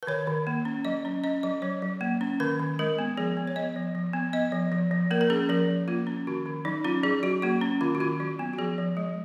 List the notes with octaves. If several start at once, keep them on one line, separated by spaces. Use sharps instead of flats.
B4
D#3 C#5
D#3
A#3
C#4
F#3 D#5
C#4
C#4 D#5
F#3 D#5
F#3 C#5
F#3
A#3
C#4
D#3 B4
D#3
G#3 A#4
B3
F3 G#4
B3
C#5
B3 D#5
F3
F3
B3
B3 D#5
F3
F3
F3
A#3 A#4
A#4
C#4 G#4
F3 A#4
F3
A#3 F4
C#4
D#3 F#4
D#3
F#3 D#4
C#4 F4
F#3 G#4
F#3 F#4
A#3 F#4
C#4
D#3 F4
F#4
D#3 F4
F#3 F#4
B3
F#4
F3 G#4
F3
G#3